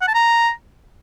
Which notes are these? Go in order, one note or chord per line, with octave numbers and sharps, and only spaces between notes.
F#5
A5
A#5